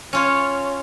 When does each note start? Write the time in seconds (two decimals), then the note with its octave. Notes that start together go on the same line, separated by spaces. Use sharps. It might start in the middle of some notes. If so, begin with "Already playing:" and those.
0.13 C#4 F4 C#5